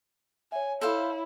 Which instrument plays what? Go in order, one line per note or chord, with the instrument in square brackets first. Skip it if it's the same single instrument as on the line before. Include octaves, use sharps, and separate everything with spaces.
[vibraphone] C#5 E5 [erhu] G#5
[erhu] E4 [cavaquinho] A4 C5 F5